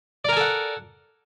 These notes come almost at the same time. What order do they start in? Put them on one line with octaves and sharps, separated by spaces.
D5 A#4 G#5 A4 F#5